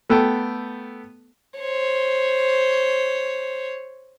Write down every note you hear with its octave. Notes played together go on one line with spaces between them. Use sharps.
A3 B3 A4 G5 A5
C5 C#5